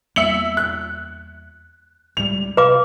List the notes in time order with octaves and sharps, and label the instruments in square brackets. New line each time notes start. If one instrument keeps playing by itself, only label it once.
[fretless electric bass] E2 G3 A#3 [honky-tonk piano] E5 C#7 F#7
[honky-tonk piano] F#6
[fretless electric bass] C#2 A2 G3 [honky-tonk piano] F7
[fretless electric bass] C3 [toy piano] B4 F5 D6